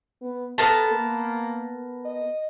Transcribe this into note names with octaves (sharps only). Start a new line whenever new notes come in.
B3
B3 A4 A#4 A5
A#3
D#5